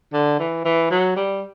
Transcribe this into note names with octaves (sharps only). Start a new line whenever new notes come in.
D3
E3
E3
F#3
G3